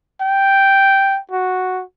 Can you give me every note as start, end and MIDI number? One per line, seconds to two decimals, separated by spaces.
0.21 1.19 79
1.31 1.83 66